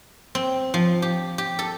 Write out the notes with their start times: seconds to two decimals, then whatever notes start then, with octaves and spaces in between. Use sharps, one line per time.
0.35 C4
0.74 F3
1.02 G4
1.38 G4
1.59 A4